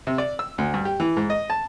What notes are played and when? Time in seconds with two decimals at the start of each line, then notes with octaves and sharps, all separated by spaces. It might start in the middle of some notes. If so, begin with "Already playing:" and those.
0.07 C3
0.18 D5
0.39 E6
0.58 D2
0.74 G2
0.85 G4
1.00 E3
1.17 G#2
1.30 D#5
1.50 A5